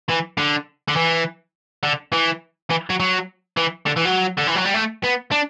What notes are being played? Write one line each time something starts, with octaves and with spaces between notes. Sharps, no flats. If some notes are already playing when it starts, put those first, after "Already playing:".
E3
D3
D3
E3
D3
E3
E3
F#3
F#3
E3
D3
E3
F#3
D3
E3
F#3
G3
A3
B3
D4